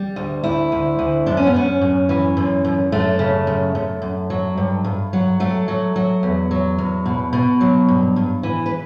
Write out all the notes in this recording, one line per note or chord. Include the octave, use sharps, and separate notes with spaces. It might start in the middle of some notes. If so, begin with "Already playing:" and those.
Already playing: G3
D2
D2 E4
D2
D2
F#2 D4
C#4
B3
F#2 C#4
F#2
E3
F#2
F#2
F#2 A3
C#3
F#2
F#2
F#2
F#3
G2
G2
F#3
F#3 A3
F#3
F#3
E2
F#3
E2
B2
B2
F#3
G2
G2
E3
B4